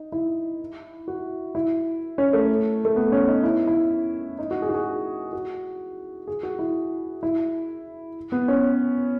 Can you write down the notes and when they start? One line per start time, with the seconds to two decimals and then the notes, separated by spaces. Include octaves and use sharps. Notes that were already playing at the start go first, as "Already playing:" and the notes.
Already playing: D#4
0.12 E4
1.08 F#4
1.55 E4
2.18 C#4
2.33 A3
2.85 A3
2.96 B3
3.12 C#4
3.28 D#4
3.43 E4
3.67 E4
4.39 D#4
4.51 F#4
4.62 G#4
4.69 F#4
4.74 G#4
5.33 F#4
6.27 G#4
6.43 F#4
6.59 E4
7.23 E4
8.32 B3
8.48 C#4